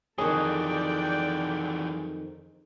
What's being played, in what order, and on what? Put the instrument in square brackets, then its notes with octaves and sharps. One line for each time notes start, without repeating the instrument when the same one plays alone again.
[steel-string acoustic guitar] F2 D#3 [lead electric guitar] E3 F#3 [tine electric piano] G#4 [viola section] A4 D5 G5